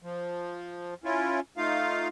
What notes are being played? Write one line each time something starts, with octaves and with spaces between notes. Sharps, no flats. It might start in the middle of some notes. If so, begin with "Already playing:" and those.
F3
C#4 E4 F4
A3 D#4 F4 F5